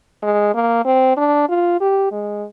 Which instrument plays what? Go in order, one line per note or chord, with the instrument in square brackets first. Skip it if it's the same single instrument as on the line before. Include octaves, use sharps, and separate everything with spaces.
[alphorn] G#3
A#3
C4
D4
F4
G4
G#3